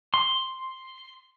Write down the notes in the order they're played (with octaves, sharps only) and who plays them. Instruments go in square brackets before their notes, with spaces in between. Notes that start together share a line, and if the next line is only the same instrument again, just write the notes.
[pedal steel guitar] C6